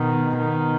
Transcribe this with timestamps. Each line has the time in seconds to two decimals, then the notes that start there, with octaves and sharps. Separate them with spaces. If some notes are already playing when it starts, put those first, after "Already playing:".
Already playing: B2 D#3
0.37 B2 D#3